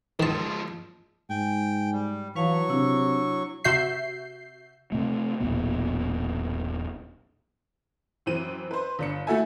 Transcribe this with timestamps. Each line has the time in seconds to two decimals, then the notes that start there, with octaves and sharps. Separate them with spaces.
0.20 D#3 F3 G#3 A5
1.30 G#2 G5 G#5
1.93 G3
2.36 E3 F#3 B4 F5 A5 C#6
2.69 C3 D4 E4 E6
3.64 C3 F#4 E5 G6 C7
4.92 C3 A3
5.40 E1 B1 A#2 B3
8.26 F#2 E3 C4 D#7
8.71 B4 C5
8.99 G1 D4 C#7
9.27 A3 E4 F#4 A4 E5 G#5